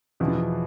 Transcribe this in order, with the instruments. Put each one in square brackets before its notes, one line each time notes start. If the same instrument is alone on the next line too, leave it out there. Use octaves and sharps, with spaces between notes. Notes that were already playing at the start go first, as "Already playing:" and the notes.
[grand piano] E2 B2 B3 E4 [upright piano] F3
[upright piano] E3
F3